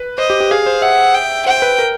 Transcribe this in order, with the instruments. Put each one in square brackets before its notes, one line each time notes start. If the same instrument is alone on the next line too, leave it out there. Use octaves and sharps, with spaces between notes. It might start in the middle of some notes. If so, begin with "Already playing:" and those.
Already playing: [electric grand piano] B4
[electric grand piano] C5 [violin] D#5
[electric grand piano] G4
G4
[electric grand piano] G#4 [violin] F5
[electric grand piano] C5
[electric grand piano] E5 [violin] F#5
[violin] G5
[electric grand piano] C5 [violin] G5
[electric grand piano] B4
A#4